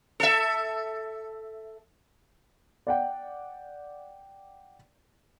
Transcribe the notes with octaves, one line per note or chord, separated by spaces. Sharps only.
A4 E5
D5 F#5 G5